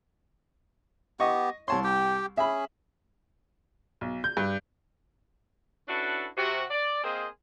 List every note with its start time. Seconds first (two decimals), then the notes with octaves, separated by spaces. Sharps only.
1.20 B3 G4 D#5 C#6
1.68 C2 C#5 A5 C6
1.84 G4 G5
2.37 C#4 G#4 E5 B5
4.01 B1
4.24 G6
4.37 G2
5.88 C#4 D4 E4 F#4 A4 B4
6.36 C3 F#4
6.71 D5
7.04 A#3 C4 G#4 A#4 C5 D#5